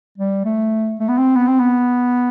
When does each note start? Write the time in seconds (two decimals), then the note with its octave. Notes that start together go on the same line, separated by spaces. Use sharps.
0.18 G3
0.45 A3
1.00 A3
1.09 B3
1.18 C4
1.36 B3
1.48 C4
1.60 B3